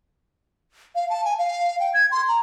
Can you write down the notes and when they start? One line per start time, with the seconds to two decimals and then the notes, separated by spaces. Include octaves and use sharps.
0.95 F5
1.10 A5
1.25 G#5
1.39 F5
1.80 G5
1.94 G#6
2.12 C6
2.28 A#5